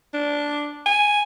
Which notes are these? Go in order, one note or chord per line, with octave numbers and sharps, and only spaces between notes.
D4
G#5